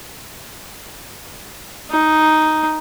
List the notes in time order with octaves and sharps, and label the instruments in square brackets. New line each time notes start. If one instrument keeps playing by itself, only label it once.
[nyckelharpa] D#4